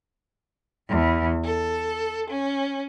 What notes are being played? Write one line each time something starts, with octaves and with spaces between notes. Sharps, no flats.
E2
A4
C#4